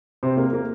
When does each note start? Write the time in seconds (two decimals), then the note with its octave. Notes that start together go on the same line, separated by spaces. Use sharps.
0.23 C3 C5
0.37 A#3
0.53 A#3